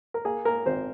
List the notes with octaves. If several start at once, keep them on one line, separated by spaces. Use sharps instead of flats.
A#4
A#3 G#4
A#3 A#4
G#1 C5